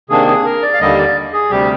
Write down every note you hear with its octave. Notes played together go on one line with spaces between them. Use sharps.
C3 D#3 A#3 D4 G#4
G#4
A#4
D5
F5
D#2 D3 G3 A#3 D#5
D5
G#4
D2 C3 G3 G4